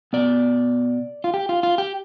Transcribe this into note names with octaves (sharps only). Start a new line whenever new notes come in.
B2 B3 D5
F4
G4
F4
F4
G4